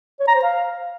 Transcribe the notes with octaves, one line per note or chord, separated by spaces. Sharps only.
C#5
A#5
C5
F5